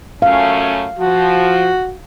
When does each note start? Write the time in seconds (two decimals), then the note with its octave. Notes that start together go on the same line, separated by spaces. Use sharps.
0.22 F#2 A3 C#4 F5
0.99 F3 F#4